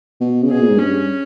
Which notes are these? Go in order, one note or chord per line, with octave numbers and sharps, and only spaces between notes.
B2
C#3
B2 G#4
A#2
G#2
G2 C#4